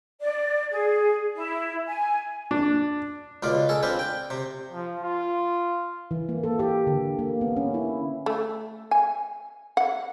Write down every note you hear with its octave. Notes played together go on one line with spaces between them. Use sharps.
D5
G#4
E4
G#5
D4
C#2 B2 F4 D5
G#4 A4
C4 D4 F4 B4
G5
C3
F3
F4
E3
A#3
A4
G4
D3
A#3
B3
C#4
E4
A3
G#5
F#5